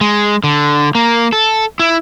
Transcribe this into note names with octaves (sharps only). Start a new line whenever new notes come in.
G#3
D3
A#3
A4
E4